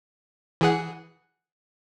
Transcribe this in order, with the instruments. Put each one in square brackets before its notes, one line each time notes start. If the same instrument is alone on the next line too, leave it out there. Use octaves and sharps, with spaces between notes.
[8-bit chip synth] E3 G#4 F#5